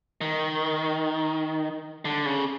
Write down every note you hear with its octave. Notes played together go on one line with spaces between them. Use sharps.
D#3
D3
C#3